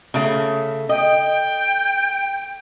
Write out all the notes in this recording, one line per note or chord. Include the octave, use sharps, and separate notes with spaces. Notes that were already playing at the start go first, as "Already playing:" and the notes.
C#3 A3
D#5 G5